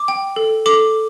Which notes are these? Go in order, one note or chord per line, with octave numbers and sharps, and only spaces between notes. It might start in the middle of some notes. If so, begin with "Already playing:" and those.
Already playing: D6
G5
A4
A4 D6